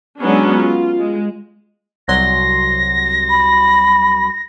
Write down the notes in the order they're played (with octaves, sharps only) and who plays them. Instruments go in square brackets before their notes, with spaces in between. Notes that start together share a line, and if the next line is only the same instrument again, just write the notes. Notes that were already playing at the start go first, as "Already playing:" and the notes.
[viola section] F#3 G#3 B3 C#4 D4
F4
G#3
[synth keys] C2 F#3 C6 [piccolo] A#6
[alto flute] B5